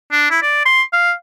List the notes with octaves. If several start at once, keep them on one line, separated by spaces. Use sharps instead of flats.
D4
E4
D5
C6
F5